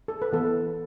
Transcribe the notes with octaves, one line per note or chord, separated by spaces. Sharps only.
A4
B4
E3 B3 A4